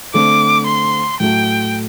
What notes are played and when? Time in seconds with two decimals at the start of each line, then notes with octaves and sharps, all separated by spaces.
0.13 D3 A3 C4 D6
0.67 C6
1.20 A2 F#3 A3 G5